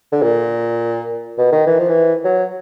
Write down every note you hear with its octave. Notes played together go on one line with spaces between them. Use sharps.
D3
A#2
B2
D#3
E3
F3
E3
F#3